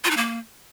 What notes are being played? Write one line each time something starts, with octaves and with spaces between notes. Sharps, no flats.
F4
D#4
A#3